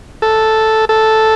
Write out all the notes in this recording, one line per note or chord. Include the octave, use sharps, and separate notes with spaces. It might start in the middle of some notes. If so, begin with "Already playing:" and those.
A4
A4